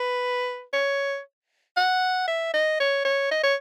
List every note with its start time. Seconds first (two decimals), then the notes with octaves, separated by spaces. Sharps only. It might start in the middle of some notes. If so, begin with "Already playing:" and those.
Already playing: B4
0.73 C#5
1.77 F#5
2.28 E5
2.53 D#5
2.80 C#5
3.05 C#5
3.31 D#5
3.43 C#5